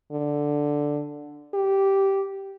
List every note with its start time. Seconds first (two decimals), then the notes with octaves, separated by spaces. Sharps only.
0.12 D3
1.54 G4